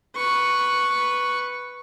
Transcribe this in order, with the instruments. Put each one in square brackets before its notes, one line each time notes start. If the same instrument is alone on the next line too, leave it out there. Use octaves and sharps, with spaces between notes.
[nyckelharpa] B4 C#6